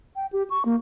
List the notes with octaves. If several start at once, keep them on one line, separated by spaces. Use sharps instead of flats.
G5
G4
C#6
A#3